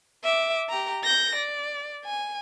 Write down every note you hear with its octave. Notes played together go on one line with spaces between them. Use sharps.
E5 D6
G4 A#5
G6 A#6
D5
G#5